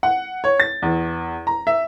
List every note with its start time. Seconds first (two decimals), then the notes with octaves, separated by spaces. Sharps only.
0.03 F#5
0.44 C#5
0.60 A6
0.82 E2
1.47 A#5
1.67 E5